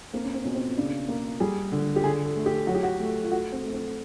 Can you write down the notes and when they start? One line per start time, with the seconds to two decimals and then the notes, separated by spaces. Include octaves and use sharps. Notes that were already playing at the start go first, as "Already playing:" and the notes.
0.13 A#3 C4
0.24 C#4
0.34 C4
0.44 B2 C#4
0.55 C4
0.77 C#3 D4
1.08 A#3
1.40 G3 G#4
1.72 D3
1.96 G4
2.04 D3 G#4
2.25 A4
2.36 A3
2.46 G4
2.67 F#3 F#4
2.75 G4
2.83 F#4
3.00 A3
3.23 F4
3.31 A3 F#4
3.52 C4
3.62 A3
3.73 C4